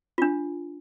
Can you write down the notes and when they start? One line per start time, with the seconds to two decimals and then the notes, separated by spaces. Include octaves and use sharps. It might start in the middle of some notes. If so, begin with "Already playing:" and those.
0.18 D4 F4